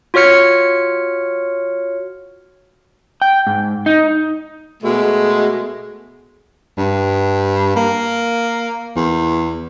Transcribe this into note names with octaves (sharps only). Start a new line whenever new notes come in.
F4 F#4 C#5 F6 C#7
G5
G#2
D#4
B2 G#3 A3
G2
A#3
E2